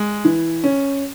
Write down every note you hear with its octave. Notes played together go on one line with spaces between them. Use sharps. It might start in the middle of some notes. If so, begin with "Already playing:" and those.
Already playing: G#3
E3
C#4